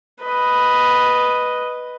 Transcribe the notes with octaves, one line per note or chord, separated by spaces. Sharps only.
B4 D#5